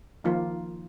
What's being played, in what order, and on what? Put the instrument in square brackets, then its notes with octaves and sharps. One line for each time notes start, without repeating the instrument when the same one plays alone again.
[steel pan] D#3 F3 A#3 F4